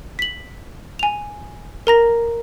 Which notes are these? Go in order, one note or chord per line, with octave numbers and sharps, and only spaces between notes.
B6 F#7
G#5 F7
A#4 A#5 A#6